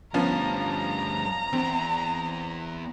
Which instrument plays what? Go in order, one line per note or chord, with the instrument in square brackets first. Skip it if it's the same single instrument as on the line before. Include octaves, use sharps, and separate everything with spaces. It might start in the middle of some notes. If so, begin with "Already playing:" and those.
[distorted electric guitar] D2 G2 [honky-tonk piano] F3 B3 C#4 [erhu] A#5
[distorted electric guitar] E2 [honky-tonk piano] C4